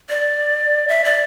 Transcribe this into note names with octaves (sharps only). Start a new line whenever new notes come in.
D5
E5
D5